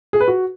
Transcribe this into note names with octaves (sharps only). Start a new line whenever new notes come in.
G#4
B4
F#4